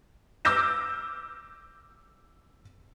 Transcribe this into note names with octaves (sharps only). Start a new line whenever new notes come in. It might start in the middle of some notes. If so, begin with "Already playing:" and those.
D6 E6 F6 G6 A#6 E7